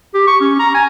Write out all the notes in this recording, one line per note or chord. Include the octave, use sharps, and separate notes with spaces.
G4
C#6
C#4
A#5
G#5